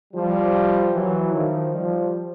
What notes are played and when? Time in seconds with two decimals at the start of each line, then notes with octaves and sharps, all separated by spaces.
0.13 F3 G3
0.93 E3 F#3
1.32 D#3 F3
1.72 F3 G3